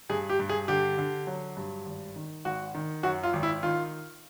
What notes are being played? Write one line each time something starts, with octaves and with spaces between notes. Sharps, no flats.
G2 G#4
G4
G2
G#4
D3 G4
D3
F#3
G2
G#1
D#3
G#1 F#4
D#3
F#2 F#4
F4
G#1
E4
D#3 F4